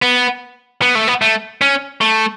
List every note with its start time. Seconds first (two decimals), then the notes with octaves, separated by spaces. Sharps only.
0.02 B3
0.82 B3
0.95 A3
1.08 B3
1.22 A3
1.62 C#4
2.01 A3